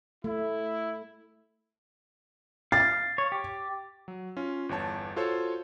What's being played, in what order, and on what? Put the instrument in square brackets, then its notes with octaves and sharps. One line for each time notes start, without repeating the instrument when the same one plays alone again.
[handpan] A3 [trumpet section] E4
[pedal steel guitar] F5 [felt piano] A6
[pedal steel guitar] C#5
G4
[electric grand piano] F#3
C#4 F4
G1 E2 C#5 A5
F4 F#4 A4 C5 C#5